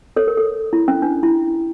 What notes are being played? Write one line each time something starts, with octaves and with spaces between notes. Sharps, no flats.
A4 C#5
A#4
A4
E4
C#4
D4
E4